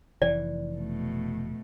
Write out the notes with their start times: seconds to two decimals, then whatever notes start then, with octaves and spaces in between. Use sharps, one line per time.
0.22 F1 E3 D5
0.75 B2 A3